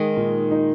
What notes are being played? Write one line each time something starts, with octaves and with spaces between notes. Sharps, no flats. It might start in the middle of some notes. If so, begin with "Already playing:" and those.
Already playing: D#3 G#3
A#2
D#4